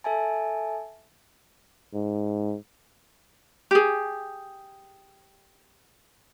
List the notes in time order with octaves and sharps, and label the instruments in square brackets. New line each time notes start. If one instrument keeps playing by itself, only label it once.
[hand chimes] A4 E5 G#5 A5
[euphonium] G#2
[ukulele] G4 G#4